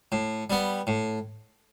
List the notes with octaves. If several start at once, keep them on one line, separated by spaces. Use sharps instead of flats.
A2
G3 B3
A2